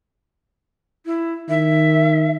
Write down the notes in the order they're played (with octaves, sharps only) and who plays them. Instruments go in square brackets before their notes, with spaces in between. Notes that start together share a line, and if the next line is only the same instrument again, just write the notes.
[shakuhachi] E4
[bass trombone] D#3 [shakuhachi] E5